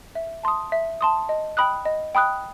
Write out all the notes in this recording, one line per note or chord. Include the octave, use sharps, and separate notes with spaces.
E5
A5 C6 D#6
E5
A5 C6 D#6
D#5
G5 B5 D#6 F#6
D#5
G5 B5 D#6 F#6